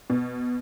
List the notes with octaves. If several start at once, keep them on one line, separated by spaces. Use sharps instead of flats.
B2